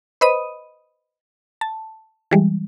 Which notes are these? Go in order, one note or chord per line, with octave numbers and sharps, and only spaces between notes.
B4 C5 D#5 B5 D#6 D#7
A5
E3 G3 G#3